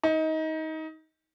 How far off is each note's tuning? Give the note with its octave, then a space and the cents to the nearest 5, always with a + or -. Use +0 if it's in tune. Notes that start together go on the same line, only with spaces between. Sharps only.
D#4 +25